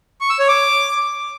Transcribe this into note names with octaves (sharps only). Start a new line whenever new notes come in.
C#6
E6
C#5
D6